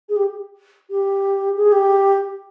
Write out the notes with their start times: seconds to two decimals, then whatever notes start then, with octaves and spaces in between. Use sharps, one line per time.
0.09 G#4
0.16 G4
0.90 G4
1.56 G#4
1.72 G4